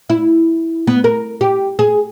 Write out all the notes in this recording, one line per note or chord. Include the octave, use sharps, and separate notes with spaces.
E4
B3
A#4
G4
G#4